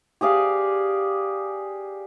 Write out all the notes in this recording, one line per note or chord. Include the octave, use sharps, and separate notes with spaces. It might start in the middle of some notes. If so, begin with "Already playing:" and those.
G4 G#4 D5 F5